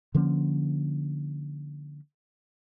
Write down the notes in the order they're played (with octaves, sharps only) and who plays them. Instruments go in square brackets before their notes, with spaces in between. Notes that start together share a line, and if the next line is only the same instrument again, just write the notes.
[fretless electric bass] D3 F3 A#3 C#4